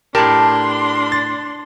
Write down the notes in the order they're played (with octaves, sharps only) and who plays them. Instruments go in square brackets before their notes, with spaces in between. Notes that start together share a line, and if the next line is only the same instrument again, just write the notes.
[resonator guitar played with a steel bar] A2 A5 [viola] D4 C6 [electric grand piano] G4 A#4
[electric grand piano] A6